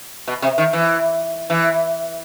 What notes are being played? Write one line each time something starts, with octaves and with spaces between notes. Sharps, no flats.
B2
C3
D#3
E3
E3